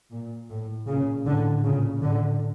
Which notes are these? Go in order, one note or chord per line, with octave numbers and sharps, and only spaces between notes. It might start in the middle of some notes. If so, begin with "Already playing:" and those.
A#2
A2
A#2 C#3
A2 D3
A#2 C#3
A2 D3